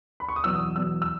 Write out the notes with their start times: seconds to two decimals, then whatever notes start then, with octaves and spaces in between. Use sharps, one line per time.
0.20 B5
0.29 C#6
0.36 D#6
0.44 E2 B2 F#3 E6
0.55 D#6
0.76 E2 B2 F#3 E6
1.02 E6